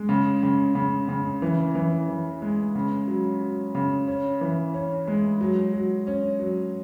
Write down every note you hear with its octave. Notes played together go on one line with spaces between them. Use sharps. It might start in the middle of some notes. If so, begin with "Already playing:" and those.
Already playing: G#3
C#3
C#3
C#3
C#3
E3
E3
E3
G#3
C#3
F#3
F#3
C#3
C#4
E3
C#4
G#3
F#3
F#3
C#4
F#3